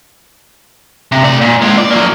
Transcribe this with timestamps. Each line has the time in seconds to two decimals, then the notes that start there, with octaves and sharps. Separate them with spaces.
1.12 C3
1.24 A3 D5
1.41 A#2
1.62 G#3 F4
1.78 D5
1.91 F#3 A#3